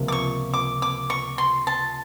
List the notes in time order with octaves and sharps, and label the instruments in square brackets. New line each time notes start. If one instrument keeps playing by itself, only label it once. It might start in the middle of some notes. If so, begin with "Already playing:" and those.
Already playing: [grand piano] C#2 C3 F3 A#3
[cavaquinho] D6
C#6
D6
D6
C#6
C6
A5